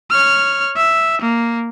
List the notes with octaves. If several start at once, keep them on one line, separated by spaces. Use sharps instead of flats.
C#5 F6
E5
A#3